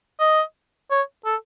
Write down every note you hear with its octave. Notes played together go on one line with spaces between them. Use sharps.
D#5
C#5
A4